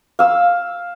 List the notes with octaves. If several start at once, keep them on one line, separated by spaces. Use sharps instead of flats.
F5 E6